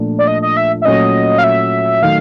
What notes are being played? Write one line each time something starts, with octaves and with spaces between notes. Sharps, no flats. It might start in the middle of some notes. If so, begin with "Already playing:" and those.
Already playing: A#2 F3 A3 D4
D5
D#5
D#5
E5
E5
A#2 F#3 A3 C#4 D#5
F5
E5
D#3 F#3 A3 F5